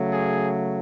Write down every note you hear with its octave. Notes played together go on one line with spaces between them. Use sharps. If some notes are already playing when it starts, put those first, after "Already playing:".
Already playing: C#3 F#3 A3
G#4